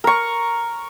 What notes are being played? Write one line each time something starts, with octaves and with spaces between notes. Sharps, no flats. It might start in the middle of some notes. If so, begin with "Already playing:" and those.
A#4 C#6